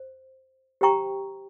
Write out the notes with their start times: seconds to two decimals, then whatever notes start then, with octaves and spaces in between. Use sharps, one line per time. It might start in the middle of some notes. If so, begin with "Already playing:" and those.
Already playing: C5
0.81 G4 C5 G5 A#5 C#6